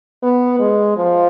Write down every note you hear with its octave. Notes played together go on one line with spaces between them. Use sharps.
B3
G#3
F3